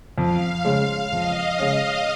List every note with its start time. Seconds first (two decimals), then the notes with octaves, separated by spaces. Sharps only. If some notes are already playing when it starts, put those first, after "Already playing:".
0.18 F2 F5
0.65 C#3 G#3 C#4
1.12 F2 D#5
1.58 C#3 G#3 C#4